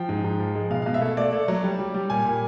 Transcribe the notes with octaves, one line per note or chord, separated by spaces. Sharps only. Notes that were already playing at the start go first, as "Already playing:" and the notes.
Already playing: F3 G5
G#2
G#2
F3
G#3
B2 F5
B2 F5
E5
A3
A3 D5
A3
F#3
G3
G3
G3
A#2 G#5
A#2